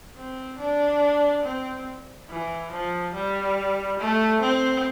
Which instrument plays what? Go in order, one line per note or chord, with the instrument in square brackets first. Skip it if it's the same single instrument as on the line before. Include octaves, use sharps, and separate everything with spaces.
[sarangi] C4
D4
C4
E3
F3
G3
A3
C4